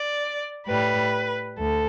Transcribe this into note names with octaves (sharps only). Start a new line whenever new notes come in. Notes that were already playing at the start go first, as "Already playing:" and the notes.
Already playing: D5
A2 G3 B4
D2 A4